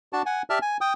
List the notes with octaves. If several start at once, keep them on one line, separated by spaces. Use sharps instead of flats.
D4 F#4 A5
F#5 G#5
G4 D5 E5 A5 F6
G#5
G5 D#6